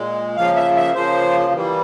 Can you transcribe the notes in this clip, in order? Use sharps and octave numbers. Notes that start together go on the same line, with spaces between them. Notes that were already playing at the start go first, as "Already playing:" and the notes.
Already playing: A#2 G#3
C#3 F3 A#3 F5
E5
E5
C#3 F3 A#3 C5
E3 G3 A#3